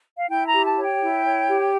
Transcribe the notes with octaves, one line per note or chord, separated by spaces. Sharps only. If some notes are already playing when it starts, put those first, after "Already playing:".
F5
E4 G5
A#5
G4
A5
C#5
G5
E4
C#5
G4